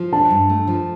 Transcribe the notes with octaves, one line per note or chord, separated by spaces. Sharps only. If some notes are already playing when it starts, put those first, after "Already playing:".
Already playing: F3
D4 A5
G2
A3
F3